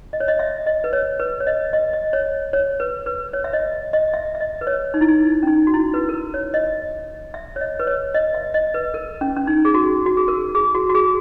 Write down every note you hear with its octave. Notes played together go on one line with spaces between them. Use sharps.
D#5
C#5
D#5
E5
D#5
B4
C#5
B4
C#5
D#5
D#5
D#5
C#5
C#5
B4
B4
C#5
E5
D#5
D#5
E5
E5
D#5
B4
C#5
D#4
E4
D#4
C#4
D#4
F#4
E4
B4
A#4
B4
C#5
D#5
E5
C#5
D#5
B4
C#5
D#5
E5
D#5
B4
A#4
C#4
C#4
D#4
G#4
F#4
F#4
G#4
A#4
G#4
F#4
F#4
G#4